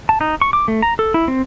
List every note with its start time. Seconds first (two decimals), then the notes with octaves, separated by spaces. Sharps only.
0.09 A5
0.21 D#4
0.41 C#6
0.53 D6
0.68 A3
0.82 A#5
0.99 A4
1.14 E4
1.28 C4